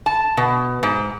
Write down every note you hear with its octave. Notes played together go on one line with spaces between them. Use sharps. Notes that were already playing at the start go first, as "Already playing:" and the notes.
A5
B2
G#2